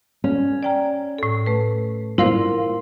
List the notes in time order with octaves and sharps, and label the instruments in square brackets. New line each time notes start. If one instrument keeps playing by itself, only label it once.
[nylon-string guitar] C#4
[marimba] D5 G5 A#5
A2 A4
A3 B4
[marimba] E4 A#4 C5 [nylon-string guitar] F4